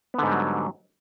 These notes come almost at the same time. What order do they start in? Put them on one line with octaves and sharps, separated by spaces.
B3 D3 G#2 G3 F#3